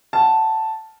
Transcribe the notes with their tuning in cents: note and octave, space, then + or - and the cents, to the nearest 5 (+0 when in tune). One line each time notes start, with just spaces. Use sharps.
F#5 +15 A5 +0